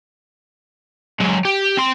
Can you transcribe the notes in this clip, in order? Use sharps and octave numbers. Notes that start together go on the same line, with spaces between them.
F#3 G#3
G4
C4 C6